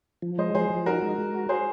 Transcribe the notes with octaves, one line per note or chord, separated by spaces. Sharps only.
F3
G#3 C5 D#5
F3 G#4 C5
F3
D#4 F#4 A#4
G#3
G#3
F#4
F#4 G#4 C5